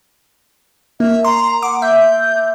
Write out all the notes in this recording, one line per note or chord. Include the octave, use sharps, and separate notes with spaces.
A#3 E5
A#5 C6
F#5 D6
E5 G6